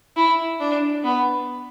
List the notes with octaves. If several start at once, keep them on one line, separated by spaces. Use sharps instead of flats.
E4
D4
B3